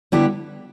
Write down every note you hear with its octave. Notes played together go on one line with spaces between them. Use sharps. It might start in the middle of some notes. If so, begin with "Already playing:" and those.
D3 G3 B3 E4 G4